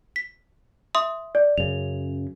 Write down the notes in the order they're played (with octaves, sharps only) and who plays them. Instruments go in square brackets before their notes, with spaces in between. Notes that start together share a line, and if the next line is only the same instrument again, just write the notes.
[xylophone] B6
E5 C6 D#6
[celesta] D5
[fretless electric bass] F#2 C#3 [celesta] F7